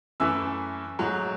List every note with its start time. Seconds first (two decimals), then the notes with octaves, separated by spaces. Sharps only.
0.20 F#2 E3 A3 E5 E6
0.99 G#2 F#3 A3